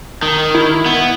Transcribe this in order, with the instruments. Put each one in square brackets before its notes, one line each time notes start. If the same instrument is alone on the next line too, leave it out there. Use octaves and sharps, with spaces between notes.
[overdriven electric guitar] D#3
[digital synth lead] E4
[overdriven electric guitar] B3